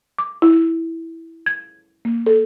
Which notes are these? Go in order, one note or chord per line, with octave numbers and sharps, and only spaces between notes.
D6
E4
G#6
A#3
A4